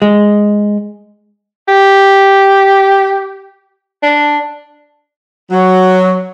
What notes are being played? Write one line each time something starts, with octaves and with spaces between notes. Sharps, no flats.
G#3
G4
D4
F#3